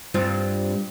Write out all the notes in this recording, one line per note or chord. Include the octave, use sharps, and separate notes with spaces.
G2 C4 F4